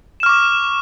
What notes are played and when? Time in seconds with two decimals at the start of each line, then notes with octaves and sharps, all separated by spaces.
0.20 E7
0.23 F6
0.26 C#6
0.29 D6